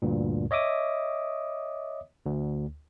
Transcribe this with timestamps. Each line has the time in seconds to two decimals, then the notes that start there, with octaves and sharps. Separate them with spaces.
0.02 D2 G2 A#2
0.51 C#5 D#5 E5 D6 D#6
2.25 D2